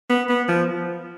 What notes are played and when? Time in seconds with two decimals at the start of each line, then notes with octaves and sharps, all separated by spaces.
0.10 B3
0.29 B3
0.48 F3